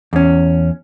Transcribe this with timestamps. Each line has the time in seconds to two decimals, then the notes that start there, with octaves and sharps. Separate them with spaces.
0.13 E2 C#4